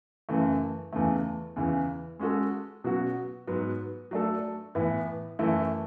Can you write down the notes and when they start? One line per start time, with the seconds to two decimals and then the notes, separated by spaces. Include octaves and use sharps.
0.29 F#2 C#3 E3 A3
0.92 E2 C#3 E3 A3
1.56 E2 C#3 E3
2.19 G#3 C#4 F#4 A4
2.84 B2 F#3 C#4 F#4
3.47 G#2 F#3 B3
4.11 F#3 A3 D4 A4
4.75 A2 E3 B3
5.39 F#2 E3 A3 C#4 E4